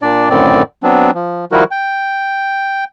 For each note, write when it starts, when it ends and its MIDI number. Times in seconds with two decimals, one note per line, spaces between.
0.02 0.29 46
0.02 0.29 62
0.02 0.29 74
0.30 0.63 42
0.30 0.63 45
0.30 0.63 50
0.30 0.63 51
0.30 0.63 60
0.30 0.63 74
0.83 1.11 54
0.83 1.11 59
0.83 1.11 60
0.83 1.11 62
1.15 1.45 53
1.52 1.64 51
1.52 1.64 53
1.52 1.64 55
1.52 1.64 64
1.52 1.64 66
1.52 1.64 70
1.71 2.84 79